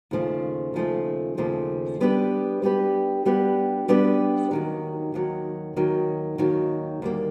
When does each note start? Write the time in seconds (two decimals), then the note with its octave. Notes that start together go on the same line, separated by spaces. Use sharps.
0.11 D#2 C#3 F3 A3
0.74 D#2 C#3 F3 A3
1.37 D#2 C#3 F3 A3
2.00 G3 B3 D4 G4 B4
2.62 G3 B3 D4 G4 B4
3.25 G3 B3 D4 G4 B4
3.88 G3 B3 D4 G4 B4
4.51 D#2 D#3 F#3
5.14 D#2 D#3 F#3
5.76 D#2 D#3 F#3
6.38 D#2 D#3 F#3
7.02 D#2 D3 G3 A#3